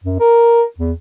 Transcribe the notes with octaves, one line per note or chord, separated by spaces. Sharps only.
F#2
A#4
E2